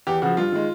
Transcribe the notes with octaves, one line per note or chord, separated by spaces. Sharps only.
E2 G4
C#3 F3 F#4
G2 F4
D#3 G#3